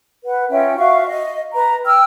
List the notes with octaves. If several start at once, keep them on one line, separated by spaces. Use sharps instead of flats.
B4 F#5
C#4 F4 E5 G5
F#4 E5 F5 C#6
D#5
B4 A#5
G5 E6 F6